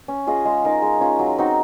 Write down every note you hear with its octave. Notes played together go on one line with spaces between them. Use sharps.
C#4
F4 G#4 D#5
G#3
D#4 A#4 F5
G#3
C#4 F4
F#3
C4 D#4 F#4